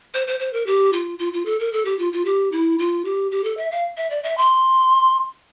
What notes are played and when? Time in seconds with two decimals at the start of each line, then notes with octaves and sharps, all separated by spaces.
0.14 C5
0.27 C5
0.39 C5
0.53 A#4
0.66 G4
0.93 F4
1.19 F4
1.33 F4
1.45 A4
1.59 A#4
1.73 A4
1.85 G4
1.99 F4
2.13 F4
2.25 G4
2.52 E4
2.79 F4
3.05 G4
3.32 G4
3.44 A4
3.57 E5
3.71 F5
3.97 E5
4.10 D5
4.23 E5
4.37 C6